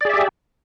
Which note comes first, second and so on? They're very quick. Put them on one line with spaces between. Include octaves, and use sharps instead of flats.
D5 G#4 E5 G4